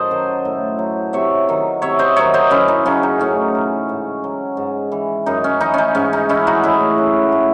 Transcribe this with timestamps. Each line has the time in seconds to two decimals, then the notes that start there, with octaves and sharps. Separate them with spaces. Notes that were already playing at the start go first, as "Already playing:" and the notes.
Already playing: F#2 A4 C5 D#5
0.11 D#3 F#3
0.45 A2
0.79 F#3
1.13 C3 C#5 E5
1.49 D#3 F#3
1.82 C3 C#5 E5
1.99 C5 D#5
2.16 D#3 F#3 C#5 E5
2.34 C5 D#5
2.50 F#2 C#4 E4
2.68 D#4
2.86 C#3 F#3 C#4
3.03 D#4
3.19 A2 C#4
3.55 E3
3.89 G#2
4.24 F#3
4.57 G#2
4.92 E3
5.26 F#2 D#4
5.44 C#4
5.61 E3 D#4
5.74 C#4 D#4
5.95 G#2 C#4
6.13 D#4
6.29 E3 C#4 E4
6.47 D#4 F#4
6.63 A2 E4 G#4
6.98 F#3
7.32 A2